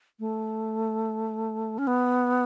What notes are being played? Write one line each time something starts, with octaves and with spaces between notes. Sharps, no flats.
A3
C#4
B3